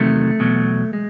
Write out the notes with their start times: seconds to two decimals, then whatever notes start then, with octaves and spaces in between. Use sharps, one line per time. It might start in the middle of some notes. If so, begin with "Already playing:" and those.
Already playing: E2 C3 D#3 F#3 A3
0.40 E2 B2 F#3
0.93 G#3